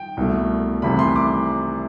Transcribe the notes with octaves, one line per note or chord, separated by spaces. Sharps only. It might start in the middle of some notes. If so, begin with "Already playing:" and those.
Already playing: G5
C2 B2 A3
C2 C3 E3 A3 B5
C6
D6